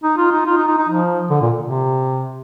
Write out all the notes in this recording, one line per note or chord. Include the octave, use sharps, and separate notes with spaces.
D#4
F4
D#4
F4
D#4
D#4
D#4
F3
D3
A#2
C3